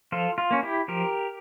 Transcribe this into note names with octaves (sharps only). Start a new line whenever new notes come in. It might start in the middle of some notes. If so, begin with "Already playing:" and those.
F3 F4 A4
F4
A#3 C#4
E4 G4
F3 G4 A#4